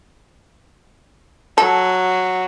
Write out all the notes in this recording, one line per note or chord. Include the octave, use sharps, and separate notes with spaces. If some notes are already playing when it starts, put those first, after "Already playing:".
F#3 A4